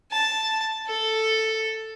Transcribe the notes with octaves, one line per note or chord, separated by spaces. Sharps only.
A5
A4